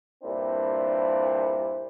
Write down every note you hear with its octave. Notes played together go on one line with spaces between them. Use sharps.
G2 A#2 C4 D4 E4